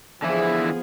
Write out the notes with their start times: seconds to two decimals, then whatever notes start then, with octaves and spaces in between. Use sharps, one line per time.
0.22 D3 E3 F3 B3 E4 G#4